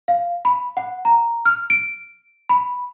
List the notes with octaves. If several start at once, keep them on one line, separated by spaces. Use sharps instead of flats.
F5
B5
F#5
A#5
F6
D7
B5